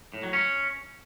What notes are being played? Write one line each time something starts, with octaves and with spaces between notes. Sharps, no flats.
A2
F#3
C#4